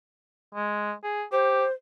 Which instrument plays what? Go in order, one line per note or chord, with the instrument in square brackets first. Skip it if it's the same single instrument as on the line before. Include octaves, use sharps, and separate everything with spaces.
[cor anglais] G#3
G#4
[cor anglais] G4 [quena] C5